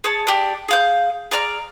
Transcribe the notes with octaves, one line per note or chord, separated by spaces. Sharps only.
G#4 C#5 A5
D4 G4
G#4 F5 G6
G#4 D5 A#5 F6